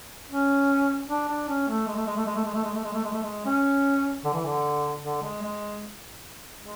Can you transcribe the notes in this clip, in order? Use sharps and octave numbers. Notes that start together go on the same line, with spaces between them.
C#4
D4
D4
C#4
A3
G#3
A3
G#3
A3
G#3
A3
G#3
A3
G#3
A3
G#3
A3
G#3
A3
G#3
C#4
D3
E3
D3
D3
G#3
G#3
G#3